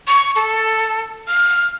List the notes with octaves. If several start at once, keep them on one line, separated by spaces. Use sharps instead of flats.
C#6
A4
F6